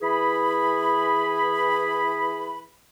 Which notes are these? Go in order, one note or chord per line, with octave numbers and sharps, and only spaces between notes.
E3 G#4 B5